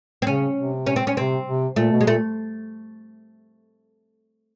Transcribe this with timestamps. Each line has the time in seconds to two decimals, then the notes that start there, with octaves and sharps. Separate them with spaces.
0.22 C4
0.26 C#3 C#4
0.57 C3
0.86 C#4
0.96 C4
1.07 C#4
1.17 C3 C4
1.47 C3
1.76 A#2 A3
1.92 B2
2.01 G#3
2.07 A#2 A3